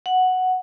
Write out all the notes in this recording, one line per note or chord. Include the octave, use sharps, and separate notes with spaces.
F#5